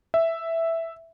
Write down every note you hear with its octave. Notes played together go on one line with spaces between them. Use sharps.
E5